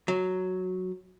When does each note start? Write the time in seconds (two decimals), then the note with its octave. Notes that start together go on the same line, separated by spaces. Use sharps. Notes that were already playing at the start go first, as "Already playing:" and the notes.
0.08 F#3